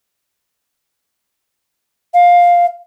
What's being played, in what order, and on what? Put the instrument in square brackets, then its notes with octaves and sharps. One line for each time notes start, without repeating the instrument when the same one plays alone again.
[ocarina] F5